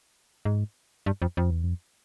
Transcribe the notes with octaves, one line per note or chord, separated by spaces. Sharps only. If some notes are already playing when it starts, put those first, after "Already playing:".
G#2
G2
F2
F2
E2
F2